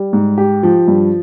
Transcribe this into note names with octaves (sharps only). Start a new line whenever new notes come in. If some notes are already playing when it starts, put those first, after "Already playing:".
Already playing: G3
G#2
G4
F3
G2